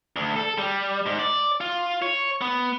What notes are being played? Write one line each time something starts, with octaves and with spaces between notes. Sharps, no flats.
D2
A4
G3
G#2
D5
F4
C#5
B3